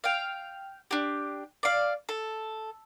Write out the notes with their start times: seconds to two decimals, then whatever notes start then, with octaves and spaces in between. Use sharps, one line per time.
0.04 F5 G5
0.91 D4 G4
1.63 D5 F5
2.09 A4